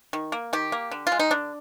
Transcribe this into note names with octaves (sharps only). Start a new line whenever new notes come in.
D#3
A#3
D#3 G4
A#3
D3
F4
G#3
D#4
D3 D4